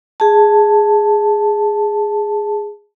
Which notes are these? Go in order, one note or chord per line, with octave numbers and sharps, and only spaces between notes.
G#4 A5